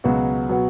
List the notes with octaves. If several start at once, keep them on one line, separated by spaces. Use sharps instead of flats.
C#2 B2 F#3 B3 F#4
B2 F#3 B3 F#4